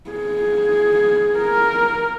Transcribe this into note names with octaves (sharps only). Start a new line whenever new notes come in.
G#4
A#4